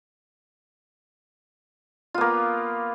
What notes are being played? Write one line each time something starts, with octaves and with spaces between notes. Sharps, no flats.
A#3 B3 F4